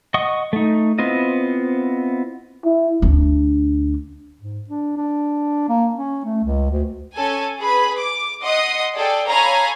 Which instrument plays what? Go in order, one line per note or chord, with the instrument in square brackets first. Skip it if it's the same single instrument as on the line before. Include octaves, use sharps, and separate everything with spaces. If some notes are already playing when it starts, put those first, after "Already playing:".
[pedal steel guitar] D#5 F#5 C#6 D#6
A3 D#4
B3 C4 E4 F4 D#5
[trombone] E4
[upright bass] D2 D4
[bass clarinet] G#2
D4
D4
A#3
C#4
A3
C#2
D2
[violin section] C#4 A4 G#5
G#4 B4 B5
D6
D#5 F#5 C6 D#6
G#4 A4 D5 G5
A4 C#5 F5 G#5 A#5 B5